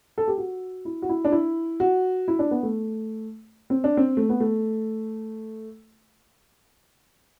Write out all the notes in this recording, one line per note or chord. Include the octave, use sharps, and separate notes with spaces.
A4
G4
F#4
E4
F#4
E4
D4
E4
F#4
E4
D4
B3
A3
C4
D4
C4
A3
B3
A3